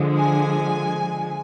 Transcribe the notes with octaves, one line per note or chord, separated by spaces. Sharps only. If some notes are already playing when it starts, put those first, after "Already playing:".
Already playing: D3 F3 G#3
G#5